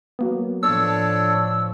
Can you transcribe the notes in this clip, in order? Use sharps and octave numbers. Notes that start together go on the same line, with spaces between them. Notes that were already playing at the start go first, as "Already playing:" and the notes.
F#3 A#3 B3
A2 F3 D4 A4 C#5 E6